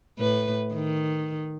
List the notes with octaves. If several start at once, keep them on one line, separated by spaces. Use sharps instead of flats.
A2 B4
D#3